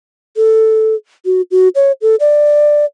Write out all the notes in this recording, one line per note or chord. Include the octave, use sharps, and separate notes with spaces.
A4
F#4
F#4
C#5
A4
D5